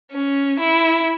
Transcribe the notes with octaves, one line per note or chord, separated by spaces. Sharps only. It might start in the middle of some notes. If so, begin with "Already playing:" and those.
C#4
E4